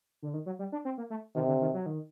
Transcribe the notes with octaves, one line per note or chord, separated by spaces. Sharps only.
D3
D#3
F#3
G3
D4
C4
A#3
A3
C3 D#3
D3
D#3
F#3
D#3